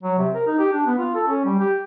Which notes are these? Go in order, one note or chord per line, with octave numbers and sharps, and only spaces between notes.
F#3
C3
A#4
D#4
G4
D4
B3
F4
A4
C#4
G3
G4